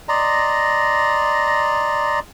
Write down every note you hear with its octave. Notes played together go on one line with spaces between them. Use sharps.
D5 D#5 A#5 C6